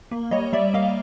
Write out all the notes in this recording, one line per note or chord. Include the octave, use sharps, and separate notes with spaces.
A#3
G3 C#5 D#5
G3 D5 E5
A#3 D#5 F5